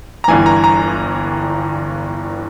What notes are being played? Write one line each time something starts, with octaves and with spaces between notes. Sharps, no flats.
A#5
G1 G2 E3 G#5
A#5
A#5